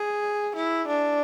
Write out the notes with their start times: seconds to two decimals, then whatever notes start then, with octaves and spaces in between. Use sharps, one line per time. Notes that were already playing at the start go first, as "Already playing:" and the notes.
Already playing: G#4
0.56 E4
0.88 D4